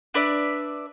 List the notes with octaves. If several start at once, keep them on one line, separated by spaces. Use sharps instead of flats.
D4 B4 D5 E5